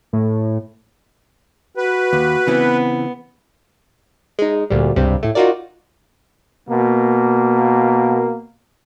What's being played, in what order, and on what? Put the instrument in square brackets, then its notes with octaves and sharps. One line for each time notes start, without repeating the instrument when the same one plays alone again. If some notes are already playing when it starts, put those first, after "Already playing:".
[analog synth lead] A2
[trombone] F#4 [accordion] B4
[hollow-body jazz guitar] D#2
[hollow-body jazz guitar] C#3 E3 C4 [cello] B3
[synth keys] G#3 D#4
D2 A#2 G3
C#2 G2 C3 G3 C4
A2 A3
D#4 F4 F#4 A#4 D5
[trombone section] B2 A#3